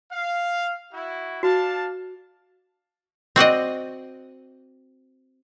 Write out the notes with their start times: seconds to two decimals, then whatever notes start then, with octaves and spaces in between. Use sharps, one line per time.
0.11 F5
0.93 E4 F#4
1.43 D4 F#4 F5 A5
3.36 C4 F#4 D5 D#5